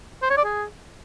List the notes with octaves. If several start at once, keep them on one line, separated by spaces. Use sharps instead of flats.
C5
C#5
D5
G#4